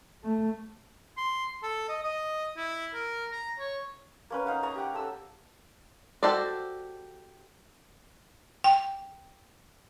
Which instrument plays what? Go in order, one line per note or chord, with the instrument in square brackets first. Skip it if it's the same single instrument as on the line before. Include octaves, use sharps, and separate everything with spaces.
[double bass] A3
[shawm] C6
A4
D#5
D#5
E4
A#4
A#5
C#5
[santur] A#3 C#4 B4
C#4 D#4 F5 F#5
C#5 D#5 A#5
G4 F#5
A4 E6
[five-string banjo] F#4 G4 A4 C5 D5
[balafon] G5